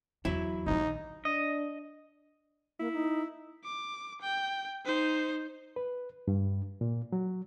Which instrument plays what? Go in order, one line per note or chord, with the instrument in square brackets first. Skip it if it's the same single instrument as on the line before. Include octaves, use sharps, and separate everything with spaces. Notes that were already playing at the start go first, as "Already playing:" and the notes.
[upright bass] E2 [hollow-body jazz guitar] F#3 E4
[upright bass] A#1 D#3 [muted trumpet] D#4
[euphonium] D4 [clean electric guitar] D#5
[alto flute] A#3 [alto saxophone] E4
[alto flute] D#4
[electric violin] D6
G5
D#4 C5
[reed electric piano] B4
G2
A#2
F#3